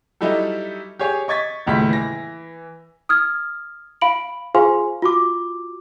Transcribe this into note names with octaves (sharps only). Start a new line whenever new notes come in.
F#3 G3 D#4 E4 G4 A4
G4 G#4 C#5 G#5
D#5 C#6 G#6 A6 B6
D#1 C#2 A2 E4 B6
E3 A#6
D#6 F6 G#6
F5 B5 D7 F#7
F4 G#4 C5 F5 G#5 C6
F4 F#4 D6